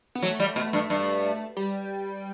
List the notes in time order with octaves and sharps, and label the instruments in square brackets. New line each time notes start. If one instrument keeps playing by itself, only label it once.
[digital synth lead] B3
[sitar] F#3 [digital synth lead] A3
[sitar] G3
B2
G2
G2
[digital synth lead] G3